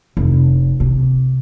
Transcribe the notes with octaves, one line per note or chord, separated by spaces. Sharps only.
F1
C3